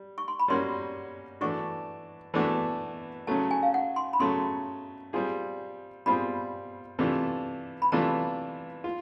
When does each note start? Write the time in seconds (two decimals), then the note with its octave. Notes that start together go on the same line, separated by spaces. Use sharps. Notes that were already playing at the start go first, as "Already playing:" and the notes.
Already playing: G3
0.18 C#6
0.28 C6
0.39 B5
0.48 G3 A#3 C#4 F#4 C6
1.41 E3 A3 D4 F#4 C#6
2.34 E3 A3 D4 F#4
3.27 C#3 F#3 A3 A5
3.51 G#5
3.63 F5
3.74 F#5
3.96 C6
4.13 B5
4.20 C#3 F#3 A3 C6
5.13 G3 C4 F4 G#4
6.06 G3 C4 F4 G#4 B5
6.99 C3 E3 A3 D4 F4
7.82 B5
7.92 C3 E3 A3 D4 F4 A#5
8.84 F4